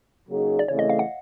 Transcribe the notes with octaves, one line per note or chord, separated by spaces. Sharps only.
C#3 F#3 A#3 D#4 G#4
D5
C#3 E3 A3 C4 C#5
D#5
F5
F#5